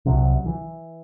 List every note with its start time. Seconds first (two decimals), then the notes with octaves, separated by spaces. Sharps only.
0.06 C2 C3 F#3
0.46 E3